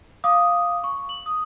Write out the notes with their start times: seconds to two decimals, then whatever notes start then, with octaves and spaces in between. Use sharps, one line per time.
0.24 F5 D6 D#6
0.84 C#6
1.09 F#7
1.26 D#6